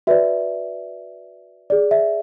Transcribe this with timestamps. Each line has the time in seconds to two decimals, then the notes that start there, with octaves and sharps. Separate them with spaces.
0.07 F#4 B4 D5 E5
1.70 G#4 D5
1.91 E5